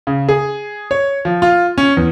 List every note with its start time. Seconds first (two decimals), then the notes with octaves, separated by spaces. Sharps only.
0.07 C#3
0.29 G#4
0.91 C#5
1.25 F3
1.42 F4
1.78 C#4
1.97 E2